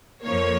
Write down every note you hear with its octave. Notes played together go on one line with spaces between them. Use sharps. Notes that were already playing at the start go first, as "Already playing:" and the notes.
F2 F3 A#3 C#5